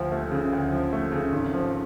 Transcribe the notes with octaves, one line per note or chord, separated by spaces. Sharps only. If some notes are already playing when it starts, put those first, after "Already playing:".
Already playing: D2 F3
A3
C#3
D2
F3
A3
C#3
G#1
F3